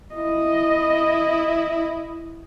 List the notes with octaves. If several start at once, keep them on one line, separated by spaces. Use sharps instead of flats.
E4 D#5